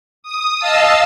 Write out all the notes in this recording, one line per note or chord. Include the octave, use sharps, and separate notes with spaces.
D#6
D#5 F5 A5 E6